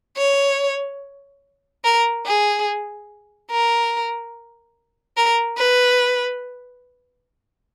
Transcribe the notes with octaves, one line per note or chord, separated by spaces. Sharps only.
C#5
A#4
G#4
A#4
A#4
B4